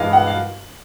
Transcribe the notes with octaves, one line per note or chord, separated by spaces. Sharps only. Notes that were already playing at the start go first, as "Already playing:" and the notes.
Already playing: G2 E3 G#3 D#5 F5
F#5
F5